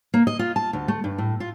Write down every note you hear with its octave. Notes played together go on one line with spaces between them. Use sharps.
A#3
D#5
F4
A5
D2
A3
G2
A2
F4